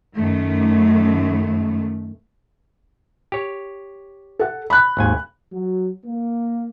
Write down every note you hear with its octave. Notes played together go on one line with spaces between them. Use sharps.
F#2 D#3 A3
G4 C#5
A4 F#5
B5 F#6
G#1 D#2 G#5
F#3
A#3